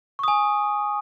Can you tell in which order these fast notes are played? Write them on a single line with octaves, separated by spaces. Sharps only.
C#6 D#6 G#5